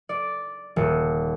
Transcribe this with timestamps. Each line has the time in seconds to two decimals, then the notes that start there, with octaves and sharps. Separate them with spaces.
0.09 D5
0.76 D#1